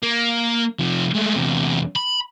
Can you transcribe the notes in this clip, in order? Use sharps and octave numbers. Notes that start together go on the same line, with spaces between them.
A#3
C3 F3
G#3 A3
E2 C3
B5